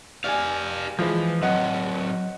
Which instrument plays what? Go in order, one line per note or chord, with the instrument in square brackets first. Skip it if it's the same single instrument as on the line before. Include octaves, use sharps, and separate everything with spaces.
[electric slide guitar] G4 F5 [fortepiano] D5 G#5
[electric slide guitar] E3 [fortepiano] F3 G#3
[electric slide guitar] F#3 C4 [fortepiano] D#5 F#5